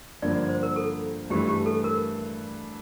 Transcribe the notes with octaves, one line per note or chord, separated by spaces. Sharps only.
G2 D3 F3 A#3 D5
D5
C5
A#4
A4
G2 E3 A3 G4
G4
A4
A#4